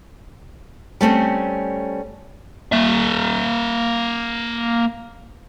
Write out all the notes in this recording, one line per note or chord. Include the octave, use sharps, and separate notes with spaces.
G3 A3 C4 C#4
A#3 E5